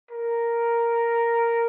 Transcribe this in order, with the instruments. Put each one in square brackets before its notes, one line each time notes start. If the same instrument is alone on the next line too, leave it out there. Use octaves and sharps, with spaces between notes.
[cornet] A#4